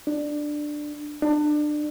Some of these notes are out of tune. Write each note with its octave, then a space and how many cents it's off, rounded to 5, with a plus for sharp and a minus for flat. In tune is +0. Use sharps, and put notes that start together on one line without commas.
D4 +10
D4 +25